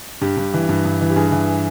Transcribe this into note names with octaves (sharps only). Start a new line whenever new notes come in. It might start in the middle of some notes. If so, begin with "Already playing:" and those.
G2 G4
G2
E3
G2
G2
E3
G4
G2 G#4
E3